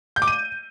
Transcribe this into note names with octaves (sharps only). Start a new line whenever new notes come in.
G6
D6
D#7